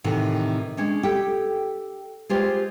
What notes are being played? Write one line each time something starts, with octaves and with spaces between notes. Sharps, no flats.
A2 C3 D#3 E3
G#3 C#4 D4
G4 A4 G5
G#3 F4 G4 C5